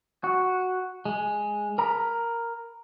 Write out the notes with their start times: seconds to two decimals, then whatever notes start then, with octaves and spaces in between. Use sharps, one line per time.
0.24 F#4
1.05 G#3
1.78 A#4 A#5 B5